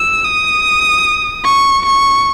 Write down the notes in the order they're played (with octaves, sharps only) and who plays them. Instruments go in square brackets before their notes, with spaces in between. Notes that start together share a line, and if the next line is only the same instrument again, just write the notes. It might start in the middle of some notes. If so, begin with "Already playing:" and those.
Already playing: [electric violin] E6
D#6
C#6
C#6